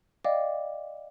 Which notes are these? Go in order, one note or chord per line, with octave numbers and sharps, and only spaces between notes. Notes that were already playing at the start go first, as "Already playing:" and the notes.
D5 D#5 F5 G5 D6